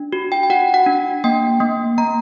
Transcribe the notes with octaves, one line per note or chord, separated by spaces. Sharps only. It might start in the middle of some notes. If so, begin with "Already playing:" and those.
Already playing: D4
F#4
G5
G5
F#4 F#5
F#5
D4
A#3 G5
A#3
A#3 A#5